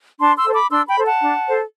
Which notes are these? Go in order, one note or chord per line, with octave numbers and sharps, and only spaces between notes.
D4 A5 C6
C6 E6
A4 C5
B5 D6
D4 C6 E6
G5 B5
A4 C5
F#5 A5
D4
A4 C5